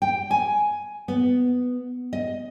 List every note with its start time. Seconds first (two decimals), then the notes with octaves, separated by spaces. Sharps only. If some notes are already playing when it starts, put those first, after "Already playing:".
0.02 G5
0.31 G#5
1.08 B3
2.13 D#5